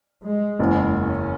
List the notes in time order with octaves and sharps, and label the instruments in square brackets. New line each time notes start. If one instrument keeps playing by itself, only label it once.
[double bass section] G#3
[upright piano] F#1 E2 C#3
[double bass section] C#4